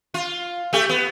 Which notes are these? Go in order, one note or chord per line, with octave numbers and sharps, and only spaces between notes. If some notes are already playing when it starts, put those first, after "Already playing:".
F4
A3 G4 A4
B3